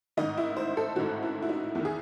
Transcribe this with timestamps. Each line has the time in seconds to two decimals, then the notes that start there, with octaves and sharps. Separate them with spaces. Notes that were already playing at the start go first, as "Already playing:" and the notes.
0.17 A1 G#2 D#3 D#5
0.37 E4
0.57 C5
0.77 A4
0.96 A1 G#2 D#3 F#4
1.23 E4
1.42 E4
1.49 D#4
1.75 E2 D#3 E4
1.85 G#4